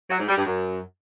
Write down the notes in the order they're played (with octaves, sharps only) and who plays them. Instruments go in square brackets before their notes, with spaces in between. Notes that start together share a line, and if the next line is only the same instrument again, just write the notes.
[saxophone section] F#3
G#2
G3
G2
F#2